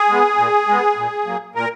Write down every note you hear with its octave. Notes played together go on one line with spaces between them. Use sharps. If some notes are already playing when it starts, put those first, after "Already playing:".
Already playing: G#4
G#3 B3
A#2
G#3 B3
A#2
F#3 A#3
A#2 A#4